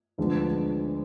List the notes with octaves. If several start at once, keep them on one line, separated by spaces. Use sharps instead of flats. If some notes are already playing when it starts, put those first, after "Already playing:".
D2 D3 F3 G#3 B3